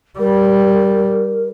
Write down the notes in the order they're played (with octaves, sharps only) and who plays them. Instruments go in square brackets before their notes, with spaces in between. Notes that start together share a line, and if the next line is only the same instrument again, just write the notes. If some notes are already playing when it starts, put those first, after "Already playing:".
[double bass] G3 [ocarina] A#4